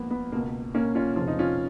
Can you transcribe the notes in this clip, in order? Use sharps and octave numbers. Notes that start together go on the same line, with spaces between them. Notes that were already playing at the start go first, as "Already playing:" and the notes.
Already playing: A#1 G#2 F3 A#3 B3
B3
C#2 B2 A#3
A#3 C#4
C#4 F4
F1 F2 C#3 F3 F4
D#4
C#4 F4